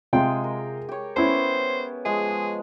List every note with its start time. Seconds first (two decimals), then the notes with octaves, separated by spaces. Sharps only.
0.13 C3 G#3 F4 G#4 G5
0.44 A#4
0.89 G4 C#5
1.16 B3 C#4 E4 C5
2.05 F3 G#3 G#4